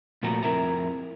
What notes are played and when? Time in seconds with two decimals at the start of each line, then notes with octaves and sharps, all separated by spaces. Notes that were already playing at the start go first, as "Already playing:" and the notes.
0.23 A#2 F3 A3 F#4 A#5
0.43 F2 A#3 E4 A#4 E5 A#5